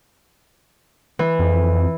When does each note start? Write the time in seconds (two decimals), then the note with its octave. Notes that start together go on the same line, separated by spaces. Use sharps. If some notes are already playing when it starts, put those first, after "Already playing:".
1.19 E3
1.39 F2